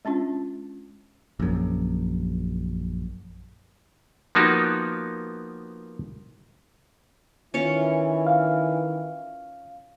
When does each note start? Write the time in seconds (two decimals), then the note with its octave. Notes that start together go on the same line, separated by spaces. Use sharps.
0.05 G#3 C#4 D4 F4
1.40 A#1 F#2
4.35 F3 A#3 B3 D#4 F#4 G4
7.54 D#3 E3 C#4 F4 C#5
8.27 F5